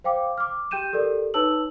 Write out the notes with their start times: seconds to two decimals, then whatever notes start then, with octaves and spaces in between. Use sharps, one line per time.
0.04 C5 F5 G5 D6
0.38 D6 F6
0.71 G4 G5 G6 D#7 E7
0.93 G4 A4 A#4 D5
1.34 D#4 B4 C#5 A5 E6 F#7